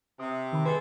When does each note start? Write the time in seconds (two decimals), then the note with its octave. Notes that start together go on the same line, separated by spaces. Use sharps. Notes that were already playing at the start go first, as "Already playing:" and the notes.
0.20 C3 D#6
0.53 D#3 B5
0.66 G#3 A4 B4 C5